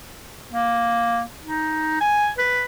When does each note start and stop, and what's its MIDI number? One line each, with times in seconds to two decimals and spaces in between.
0.53 1.22 58
1.43 1.96 63
2.01 2.29 80
2.38 2.65 71